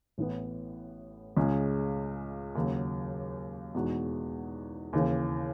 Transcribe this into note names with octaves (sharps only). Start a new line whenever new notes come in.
A1 A2 E3 B3
C#2 C#3 G#3 C#4
D#2 C#3 F#3
E2 B2 G#3 D#4 F#4
D#2 C#3 E3